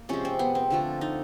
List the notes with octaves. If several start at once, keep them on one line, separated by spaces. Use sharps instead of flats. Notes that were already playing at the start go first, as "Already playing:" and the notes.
Already playing: A#3
C3 F3 G#3 C#4
C4
B3
C4
D3 F3 A3
D#4